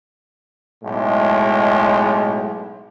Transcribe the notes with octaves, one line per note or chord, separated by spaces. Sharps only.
B1 A2 G#3